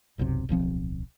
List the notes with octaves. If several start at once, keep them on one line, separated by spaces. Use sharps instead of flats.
D1 B1 F#2 C3
D1 B1 F3 C4